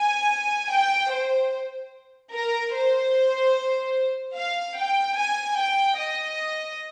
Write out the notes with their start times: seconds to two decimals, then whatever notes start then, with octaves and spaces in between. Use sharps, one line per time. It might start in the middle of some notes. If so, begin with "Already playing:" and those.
Already playing: G#5
0.72 G5
1.14 C5
2.34 A#4
2.75 C5
4.36 F5
4.77 G5
5.17 G#5
5.58 G5
5.98 D#5